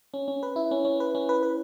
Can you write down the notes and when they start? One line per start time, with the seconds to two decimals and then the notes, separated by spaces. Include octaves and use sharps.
0.14 C#4
0.28 C#4
0.43 B4
0.56 E4
0.71 C#4
0.85 C#4
1.00 B4
1.15 C#4
1.29 B4
1.43 B4